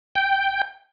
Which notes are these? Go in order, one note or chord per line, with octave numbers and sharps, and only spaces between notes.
G5